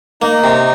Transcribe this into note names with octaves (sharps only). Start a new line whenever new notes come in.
A#3 D#4
C3